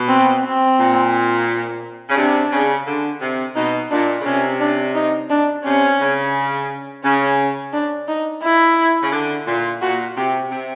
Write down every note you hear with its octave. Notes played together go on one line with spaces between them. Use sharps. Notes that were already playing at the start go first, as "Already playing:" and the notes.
Already playing: B2
C4
C4
A#2
C#3
C3 D4
C#3
D3
C3
B2 D#4
A#2 D4
C#3
C3 C#4
D4
D#4
D4
C3 C#4
C#3
C#3 C#4
D4
D#4
E4
C#3
D3
A#2
A#2 F#4
C3 G4
C3